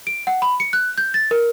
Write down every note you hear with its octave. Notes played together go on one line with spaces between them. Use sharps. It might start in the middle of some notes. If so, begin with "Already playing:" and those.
D7
F#5
B5
C#7
F#6
G6
A6
A#4